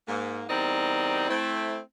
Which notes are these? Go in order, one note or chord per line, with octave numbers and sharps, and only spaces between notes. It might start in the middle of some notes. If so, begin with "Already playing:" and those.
G#2 A#3
E2 G3 C4 D#4 A#4 D5
A3 C4 E4